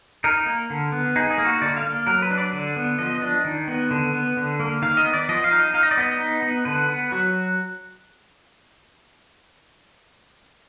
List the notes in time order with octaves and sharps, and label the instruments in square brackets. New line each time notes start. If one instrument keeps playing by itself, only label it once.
[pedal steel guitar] D#4 A#4
A#3
D3
B3
D#4 G#4
G#4
A#3
F#4
D3 D5
F5
A#3
F#3 A#4
B4
D4
D5
D3
B3
F3 D#5
D4
D#3
B3
D3
B3
D3
A#3
D#3 F5
D#5
B3
D5
F3 D#5
F5
D#4
D#5
D#4 F5
D#5
D5
B3 D#5
D#4
B3
D3 B4
B3
F#3 F#4